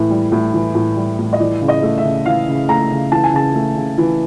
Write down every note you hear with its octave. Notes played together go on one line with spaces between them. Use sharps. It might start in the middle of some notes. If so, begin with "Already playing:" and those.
Already playing: A2 E3
G3
A2
E3
A2
G3
A2
D#5
E3 D5
C#3
D#5
A3
E5
C#3
E3 F5
C#3
A3 A#5
C#3
E3 A5
G#5
C#3 A5
A3
C#3
E3